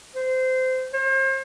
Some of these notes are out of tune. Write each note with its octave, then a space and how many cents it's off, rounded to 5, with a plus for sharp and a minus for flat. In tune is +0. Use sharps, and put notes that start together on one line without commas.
C5 -20
C5 +40